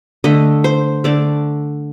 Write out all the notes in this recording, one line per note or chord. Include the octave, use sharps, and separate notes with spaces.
D3 A3 D#5
C5
D3 A3 D5